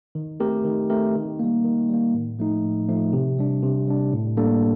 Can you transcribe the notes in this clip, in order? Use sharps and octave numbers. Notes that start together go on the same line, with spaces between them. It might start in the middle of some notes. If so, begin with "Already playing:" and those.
D#3
A3 C4 G4 A#4
D#3
A3 C4 G4 A#4
D#3
G3 A#3
D#3
G3 A#3
A2
F3 A3 D#4
A2
F3 A3 D#4
C3
G3 D4
C3
G3 D4
A2
G3 A#3 D4 A4